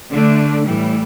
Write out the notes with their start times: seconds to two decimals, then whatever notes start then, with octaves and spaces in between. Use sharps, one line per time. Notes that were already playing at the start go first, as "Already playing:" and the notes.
0.11 D3 A3 D4
0.67 A2 E3 G3